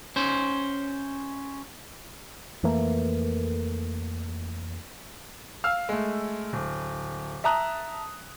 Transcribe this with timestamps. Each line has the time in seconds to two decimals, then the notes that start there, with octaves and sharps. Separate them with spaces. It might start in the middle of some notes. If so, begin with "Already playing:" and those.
0.16 C#4 C5
2.63 F2 E3 A3 A#3
5.64 F5 E6 F6
5.89 G#3 A3
6.53 D1
7.44 E5 A5 A#5 D#6 F#6